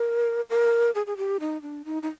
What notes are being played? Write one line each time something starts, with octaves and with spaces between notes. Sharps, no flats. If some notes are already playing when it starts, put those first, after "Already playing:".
Already playing: A#4
A#4
G#4
G#4
G4
D#4
D4
D#4
D#4